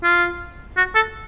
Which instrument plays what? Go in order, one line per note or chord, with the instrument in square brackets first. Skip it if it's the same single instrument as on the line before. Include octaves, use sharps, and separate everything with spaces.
[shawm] F4
F#4
A4